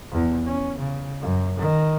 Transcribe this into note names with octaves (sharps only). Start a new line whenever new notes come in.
E2
C#4
C#3
F#2
D#3